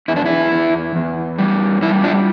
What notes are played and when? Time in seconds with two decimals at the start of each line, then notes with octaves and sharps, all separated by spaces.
0.08 E2 E4
0.16 D4
0.26 E4
0.52 E2
0.96 E2
1.38 G3
1.82 G3 E4
2.04 D4 F4